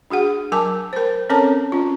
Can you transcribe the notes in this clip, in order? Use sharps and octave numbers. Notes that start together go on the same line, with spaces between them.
D4 F#4 G#4 F#5
F#3 A#4 G#5 A5 D6
A#4 C5
C4 C#4 A4 A#4 C#5 A5
C#4 F4